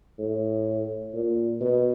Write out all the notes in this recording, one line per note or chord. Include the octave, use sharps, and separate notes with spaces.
A2
A#2
B2